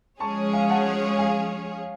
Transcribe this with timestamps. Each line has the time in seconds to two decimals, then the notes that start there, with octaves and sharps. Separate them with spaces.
0.20 F3 G#3 C#4 G#4 C#5 A5 C#6
0.53 F5 G#5
0.70 F#5 A5
1.19 F5 G#5